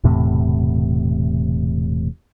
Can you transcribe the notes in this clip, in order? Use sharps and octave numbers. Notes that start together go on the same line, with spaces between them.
E1 E2 A2 C3